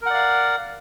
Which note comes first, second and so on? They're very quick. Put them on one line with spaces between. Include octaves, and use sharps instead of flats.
A#4 F#5 D5 F5